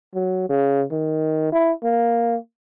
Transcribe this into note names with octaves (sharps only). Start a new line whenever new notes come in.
F#3
C#3
D#3
E4
A#3